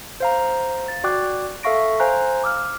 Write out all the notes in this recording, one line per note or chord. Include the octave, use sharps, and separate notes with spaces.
C5 F5 A#5
A6
F#4 D5 G5 D6 F#6
A4 E5 F5 C#6 A#6 D7
C5 F5 G#5 A#5 F#6
D6 E6 F6